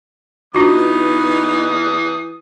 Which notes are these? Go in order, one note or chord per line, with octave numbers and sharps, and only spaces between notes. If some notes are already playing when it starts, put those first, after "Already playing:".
E3 B3 D4 D#4 F4 F#4 D#6